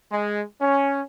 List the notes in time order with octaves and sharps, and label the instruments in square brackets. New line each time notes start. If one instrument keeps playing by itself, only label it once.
[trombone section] G#3
C#4